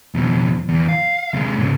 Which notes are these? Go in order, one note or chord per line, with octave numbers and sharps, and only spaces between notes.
F2 B2
E2
F5
C3 G#3
G#2 C#3